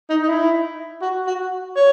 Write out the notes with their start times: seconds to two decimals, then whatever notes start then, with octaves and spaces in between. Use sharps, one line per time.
0.10 D#4
0.22 D#4
0.28 E4
1.01 F#4
1.27 F#4
1.76 C#5